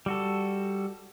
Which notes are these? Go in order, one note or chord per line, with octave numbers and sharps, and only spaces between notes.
G3 F#4 A4